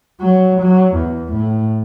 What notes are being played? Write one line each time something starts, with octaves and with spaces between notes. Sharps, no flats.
F#3
F#3
E2
A2